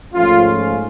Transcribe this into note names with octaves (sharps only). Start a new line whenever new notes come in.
G#2 F3 A3 C#4 F4
F4